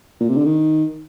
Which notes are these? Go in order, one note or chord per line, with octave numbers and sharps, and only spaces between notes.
A#2
C3
D3
D#3